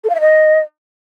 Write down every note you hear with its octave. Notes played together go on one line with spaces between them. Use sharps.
A4
F5
E5
D#5